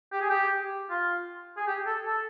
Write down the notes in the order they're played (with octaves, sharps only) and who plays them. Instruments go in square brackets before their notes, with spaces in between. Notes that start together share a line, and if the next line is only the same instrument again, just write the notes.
[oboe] G4
G#4
G4
F4
G#4
G4
A4
A4